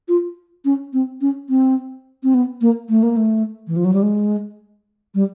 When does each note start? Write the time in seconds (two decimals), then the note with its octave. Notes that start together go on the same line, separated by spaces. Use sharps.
0.08 F4
0.65 C#4
0.93 C4
1.21 C#4
1.49 C4
2.23 C4
2.34 B3
2.61 A#3
2.89 A3
3.03 A#3
3.17 A3
3.67 E3
3.76 F3
3.85 F#3
3.94 G3
4.02 G#3
5.15 G3